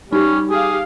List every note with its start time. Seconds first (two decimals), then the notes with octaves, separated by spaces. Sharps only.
0.13 G3 C#4 D#4
0.51 G4 G#4 F5